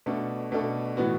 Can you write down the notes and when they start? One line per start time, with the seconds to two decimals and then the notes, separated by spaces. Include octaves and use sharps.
0.06 B2 A3 D4 A4
0.52 B2 A3 D4 A4
0.97 A2 E3 B3 F#4